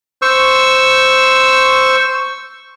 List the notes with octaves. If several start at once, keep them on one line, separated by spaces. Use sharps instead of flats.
C5 C#6 E6